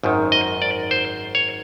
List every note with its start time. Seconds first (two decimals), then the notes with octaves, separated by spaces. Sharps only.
0.03 G#1 F#2 D#3
0.32 D#5
0.62 D5
0.91 C5
1.35 C#5